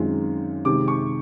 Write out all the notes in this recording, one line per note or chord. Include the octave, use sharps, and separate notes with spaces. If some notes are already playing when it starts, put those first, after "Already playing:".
Already playing: F#2 D#3 G#3 C4 F4
C3 D#3 G#3 D6
C#6